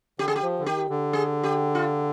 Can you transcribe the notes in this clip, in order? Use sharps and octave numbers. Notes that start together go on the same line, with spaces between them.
D3 G4
G#4
G4
F3
D3
D#3 G4
D3
G#4
G4
F4